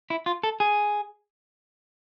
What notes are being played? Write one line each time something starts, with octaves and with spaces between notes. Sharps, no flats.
E4
F4
A4
G#4